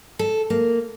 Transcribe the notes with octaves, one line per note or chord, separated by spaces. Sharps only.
A4
A#3